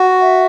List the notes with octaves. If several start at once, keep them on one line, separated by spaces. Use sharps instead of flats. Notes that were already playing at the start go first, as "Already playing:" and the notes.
Already playing: F#4
E5